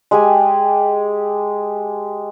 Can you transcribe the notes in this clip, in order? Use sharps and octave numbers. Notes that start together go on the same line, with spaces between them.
G#3 G4 G#5